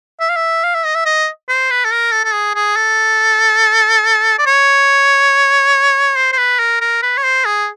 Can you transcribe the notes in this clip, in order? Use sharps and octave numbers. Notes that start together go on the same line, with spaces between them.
E5
F5
E5
F5
E5
D#5
E5
D#5
C5
B4
A4
A#4
A4
A4
G#4
G#4
A4
D5
C#5
C5
C5
B4
A#4
A#4
B4
C#5
C5
G#4